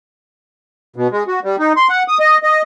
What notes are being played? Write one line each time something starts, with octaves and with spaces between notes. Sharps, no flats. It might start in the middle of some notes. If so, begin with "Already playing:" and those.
B2
G#3
F#4
G3
D#4
C6
F#5
D#6
D#5
D#5